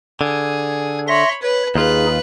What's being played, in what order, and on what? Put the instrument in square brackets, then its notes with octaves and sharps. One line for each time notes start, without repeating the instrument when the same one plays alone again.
[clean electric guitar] D3 [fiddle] G#4 [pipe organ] G#6
[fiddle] C#5 B5 [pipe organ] E5 C6 A#6
[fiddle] B4 [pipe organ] C#5
[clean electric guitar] D#2 F4 [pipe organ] D#4 G#4 [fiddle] B4 F#6